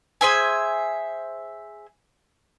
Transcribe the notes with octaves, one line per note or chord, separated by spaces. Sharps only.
G#4 C5 E5 G#5